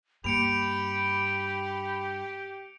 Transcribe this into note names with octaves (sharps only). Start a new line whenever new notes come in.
G2 A#3 G4 B5 C#7 D7 F7